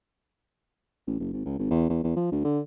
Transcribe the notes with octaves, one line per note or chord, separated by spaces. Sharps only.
A1
F#1
G#1
C#2
G#1
E2
E2
E2
F3
D2
D3